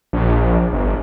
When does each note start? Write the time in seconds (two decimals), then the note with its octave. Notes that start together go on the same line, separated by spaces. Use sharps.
0.13 A#1
0.73 G1